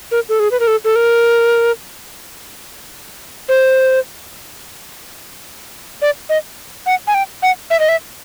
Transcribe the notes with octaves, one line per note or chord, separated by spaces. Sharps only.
A#4
A4
G#4
B4
A#4
A4
A4
A#4
C5
D5
D#5
F#5
G#5
G5
F#5
E5
D#5
E5